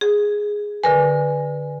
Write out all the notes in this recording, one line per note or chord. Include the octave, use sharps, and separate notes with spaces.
G#4
D3 A#4 B4 G#5